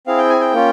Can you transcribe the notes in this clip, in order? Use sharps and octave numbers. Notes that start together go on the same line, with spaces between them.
C4 E4 G#4 F5
G5
G#5
G5
A#3 C#4 F4